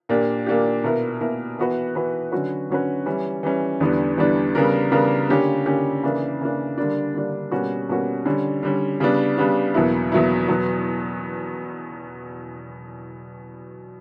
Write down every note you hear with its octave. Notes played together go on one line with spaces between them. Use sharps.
A#2 A#3 D4 G4
A#2 A#3 D4 G4
B2 A#3 E4 A#4
B2 A#3 E4 A#4
E3 B3 F#4 B4
E3 B3 F#4 B4
D3 F#3 C#4 F#4 B4
D3 F#3 C#4 F#4 B4
E3 G3 C#4
E3 G3 C#4
E2 D3 G3 B3 D4
E2 D3 G3 B3 D4
C#3 G3 B3 D4 A#4
C#3 G3 B3 D4 A#4
D3 A#3 C#4 G4
D3 A#3 C#4 G4
C#3 E3 A#3 D4
C#3 E3 A#3 D4
D3 G3 A#3 D4
D3 G3 A#3 D4
B2 G3 A#3 C#4 F#4
B2 G3 A#3 C#4 F#4
D3 G3 C#4
D3 G3 C#4
C#3 G3 B3 D4
C#3 G3 B3 D4
E2 B2 F#3 A#3 E4
E2 B2 F#3 A#3 E4
E2 B2 F#3 B3